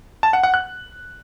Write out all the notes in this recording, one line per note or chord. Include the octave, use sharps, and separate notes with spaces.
A5
F#5
F#5
F#6